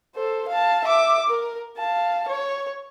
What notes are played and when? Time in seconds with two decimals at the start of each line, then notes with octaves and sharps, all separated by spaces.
0.15 A4 C5
0.48 F5 A5
0.84 E5 D6
1.30 A#4
1.77 F5 A5
2.28 C#5